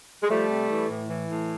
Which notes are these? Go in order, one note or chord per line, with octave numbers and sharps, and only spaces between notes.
G#3
F3 G3 A3
C3
E3
A2
E3
A2